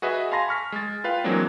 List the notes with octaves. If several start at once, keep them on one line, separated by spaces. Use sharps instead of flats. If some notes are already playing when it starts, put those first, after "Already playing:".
F#4 G#4 B4 D#5 E5
F5 G#5 A5 B5 C6 A#6
C#6 F6 B6
G#3 A6
F4 B4 F5 G5
E3 F#3 G#3 A#3 C4 D4